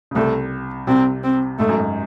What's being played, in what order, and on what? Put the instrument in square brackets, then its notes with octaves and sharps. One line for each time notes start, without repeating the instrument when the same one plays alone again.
[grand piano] C#3
[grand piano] C2 C3 [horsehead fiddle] A3
[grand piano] C2 C3 [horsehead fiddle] C4
[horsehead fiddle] C4
[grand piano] G#2 [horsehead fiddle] A3
[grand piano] F#2
G#2